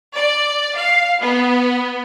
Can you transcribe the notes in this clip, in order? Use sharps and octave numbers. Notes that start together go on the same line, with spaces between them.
D5
F5
B3